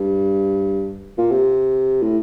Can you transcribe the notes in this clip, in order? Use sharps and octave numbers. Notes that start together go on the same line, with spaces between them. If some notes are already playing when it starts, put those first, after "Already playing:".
Already playing: G2
A#2
C3
A2